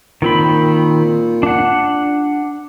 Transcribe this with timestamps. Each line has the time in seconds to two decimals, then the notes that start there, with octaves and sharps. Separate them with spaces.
0.22 A#2 D#3 C4 B5
1.43 D4 F#5